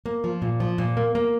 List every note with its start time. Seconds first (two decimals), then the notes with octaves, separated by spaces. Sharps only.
0.06 A#3
0.24 F3
0.42 A#2
0.60 F3
0.78 A#2
0.97 A#3
1.15 A#3